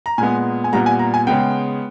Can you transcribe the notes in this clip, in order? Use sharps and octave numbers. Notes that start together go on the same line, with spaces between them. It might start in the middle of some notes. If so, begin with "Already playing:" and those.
A#5
A#2 G#3 B3 G#5
G#5
A#2 G3 B3 A#5
G#5
A#5
G#5
C#3 G#3 B3 G5